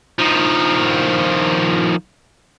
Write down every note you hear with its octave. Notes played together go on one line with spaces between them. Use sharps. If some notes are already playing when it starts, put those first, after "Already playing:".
D#3 F3